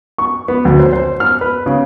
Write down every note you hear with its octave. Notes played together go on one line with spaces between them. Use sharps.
C#6
B3
D2
C5
C5
F6
B4
C#3